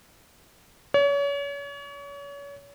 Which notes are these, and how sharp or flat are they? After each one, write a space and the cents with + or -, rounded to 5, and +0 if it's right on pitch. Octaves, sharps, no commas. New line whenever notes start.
C#5 +35